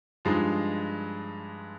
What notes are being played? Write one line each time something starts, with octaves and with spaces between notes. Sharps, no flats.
G2 F3 G#3 D#4